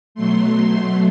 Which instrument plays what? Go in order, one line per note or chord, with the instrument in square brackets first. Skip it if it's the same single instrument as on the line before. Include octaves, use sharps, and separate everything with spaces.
[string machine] B2 F#3 A3 C6